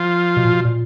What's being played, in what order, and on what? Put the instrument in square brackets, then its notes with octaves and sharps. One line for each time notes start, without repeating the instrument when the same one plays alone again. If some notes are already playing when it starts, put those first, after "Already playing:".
Already playing: [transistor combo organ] F3 F4
[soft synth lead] B2
A#2
B2
A#2